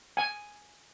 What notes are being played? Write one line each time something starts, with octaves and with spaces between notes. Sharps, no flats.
G#5